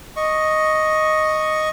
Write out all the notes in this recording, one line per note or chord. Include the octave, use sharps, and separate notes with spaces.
D#5 C#6